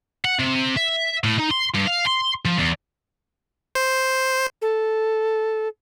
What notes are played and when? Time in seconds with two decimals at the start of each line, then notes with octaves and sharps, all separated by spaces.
0.25 F#5
0.39 C3
0.77 E5
1.24 A2
1.39 D#4
1.51 C6
1.74 G2
1.86 F5
2.06 C6
2.45 F3
2.59 E2
3.75 C5
4.62 A4